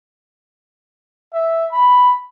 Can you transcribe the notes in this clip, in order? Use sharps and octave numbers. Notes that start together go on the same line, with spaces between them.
E5
B5